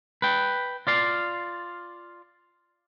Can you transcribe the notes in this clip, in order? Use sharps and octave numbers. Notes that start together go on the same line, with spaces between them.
B4 G5
F4 D5 F5